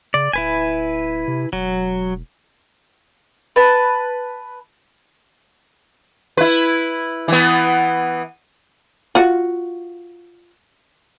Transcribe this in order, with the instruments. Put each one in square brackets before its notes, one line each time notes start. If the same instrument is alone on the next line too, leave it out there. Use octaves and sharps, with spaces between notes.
[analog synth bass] C#3 [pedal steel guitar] D5
[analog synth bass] D1 [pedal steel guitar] E4 B4 G#5
[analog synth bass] C3
[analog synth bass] E1 [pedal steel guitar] F#3
[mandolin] B4 A5
[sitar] E4 B4
E3 B3
[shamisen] F4 F#4